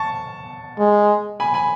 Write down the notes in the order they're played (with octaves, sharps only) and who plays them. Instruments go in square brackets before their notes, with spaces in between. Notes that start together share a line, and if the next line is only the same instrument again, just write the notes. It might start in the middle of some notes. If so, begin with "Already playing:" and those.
Already playing: [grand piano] A5 C#6
[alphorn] G#3
[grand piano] G#5 B5
G#5 B5